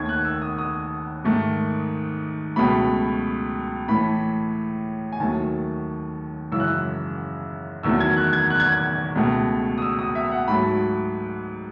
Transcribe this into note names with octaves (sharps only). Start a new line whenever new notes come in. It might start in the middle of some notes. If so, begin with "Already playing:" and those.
Already playing: D#2 D#3 A3 G#6
F#6
E6
D#6
D#6
G#2 D#3 A3
C#2 B2 F#3 A3 B5
A2 E3 A3 B5
G#5
D#2 D#3 F#3 A3 A5
F#2 C#3 E3 G#3 E6
F#6
E6
E2 D#3 F#3 A3 E6
G#6
F#6
G#6
F#6
G#6
F#6
C#2 B2 A3
D#6
E6
D#6
E5
F#5
G#2 F#3 A3 B5